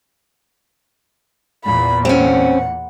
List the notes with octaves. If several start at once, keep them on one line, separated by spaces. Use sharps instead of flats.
E2 A#2 B5
C4 C#4 F#5